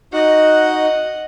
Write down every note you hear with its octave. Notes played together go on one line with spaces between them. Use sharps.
D#4 F#4 D#5 F#5